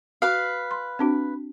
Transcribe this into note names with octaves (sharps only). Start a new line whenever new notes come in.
F#4 B4 F5
C6
C4 D4 F#4